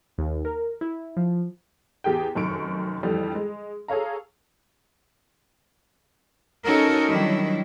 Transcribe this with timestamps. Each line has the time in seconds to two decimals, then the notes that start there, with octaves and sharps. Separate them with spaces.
0.18 D#2
0.45 A#4
0.81 E4
1.17 F3
2.04 E2 G4 G#4 G5
2.35 F1 F#2 D#3 C#6 D7
3.03 F2 D3 E3 G3 A3
3.35 G#3
3.88 G#4 A4 C#5 F5 A#5
6.65 C#4 D#4 F#4 A4 A#4
7.08 D#3 E3 F#3 G3 D4 E4